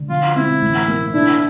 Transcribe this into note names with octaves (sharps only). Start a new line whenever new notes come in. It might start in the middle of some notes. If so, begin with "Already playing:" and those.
Already playing: D3
F3 F4
C4 E4
A1
A#3
D4 E4